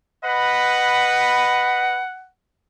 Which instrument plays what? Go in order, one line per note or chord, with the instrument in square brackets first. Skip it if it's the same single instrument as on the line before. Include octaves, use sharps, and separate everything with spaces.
[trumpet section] B4 D#5 B5 [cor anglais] F#5